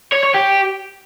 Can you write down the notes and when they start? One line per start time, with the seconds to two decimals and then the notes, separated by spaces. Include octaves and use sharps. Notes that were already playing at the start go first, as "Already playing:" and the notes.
0.12 C#5
0.23 C#5
0.34 G4